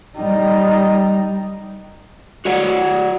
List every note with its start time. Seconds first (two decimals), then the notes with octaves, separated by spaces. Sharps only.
0.17 G3 D#4
2.45 F#4 C#5 D5 F#5